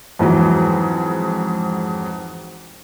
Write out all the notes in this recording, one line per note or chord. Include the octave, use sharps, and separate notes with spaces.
F2 G#2 E3 F#3